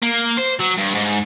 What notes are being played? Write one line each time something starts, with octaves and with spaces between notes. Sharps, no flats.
A#3
C5
F#3
G2
G#2